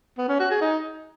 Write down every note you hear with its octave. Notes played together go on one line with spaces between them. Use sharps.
B3
C#4
F#4
G#4
D#4